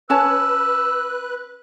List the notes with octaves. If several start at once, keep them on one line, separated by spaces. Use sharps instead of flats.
C#4 B4 C#5 A5 E6 F#6